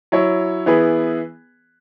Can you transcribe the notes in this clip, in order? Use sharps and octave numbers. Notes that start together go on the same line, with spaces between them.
F#3 E4 C#5
E3 B3 E4 G#4 B4